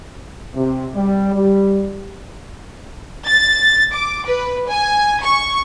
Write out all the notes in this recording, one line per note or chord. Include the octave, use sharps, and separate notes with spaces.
C3
G3
G3
A6
D6
B4
G#5
C#6